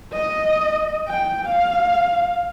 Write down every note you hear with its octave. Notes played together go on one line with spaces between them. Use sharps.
D#5
G5
F5